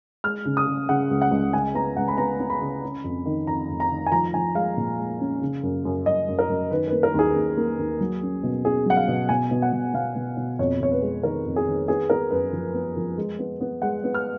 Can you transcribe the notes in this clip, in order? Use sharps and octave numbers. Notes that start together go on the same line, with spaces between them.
G#3 F6
C#3
D#6
C#3
C#3 F#5
C#2
F#5
C#2
C#3 G#5
B3 A#5
C#2 F#5
B5
B3 A#5
B3
B5
C#3
C#4
F2
D#3
F2 A#5
F2
A#5
D#3
G#5
F3 A#5
F3 G#5
G#3 F5
A#2
G#3
C#4
C#3
F#2
F#2
F#2 D#5
F#2
A#4
F#2
D#3 B4
A#3 B4
A#4
D#2 G#4
D#2
A#3
D#2
F#3
C#4
B2
C#4 G#4
F#3 F#5
F5
B2
B2 G#5
B2
F#5
B2
B2 F5
B2
B2
F2 C#5
F2 C#5
B4
G#3
D#3 A#4
F2
G#4
D#3
B3 G#4
B3 A#4
F#2 B4
F3
B3
F3
G#3
B3
B3
G#3 F#5
B3
F6